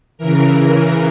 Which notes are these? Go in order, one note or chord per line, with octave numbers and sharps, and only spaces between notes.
C#3 E3 A#4